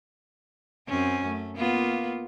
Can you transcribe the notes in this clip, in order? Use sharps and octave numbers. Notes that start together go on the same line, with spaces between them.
F#2 C4 C#4
A3
A#3 B3 F4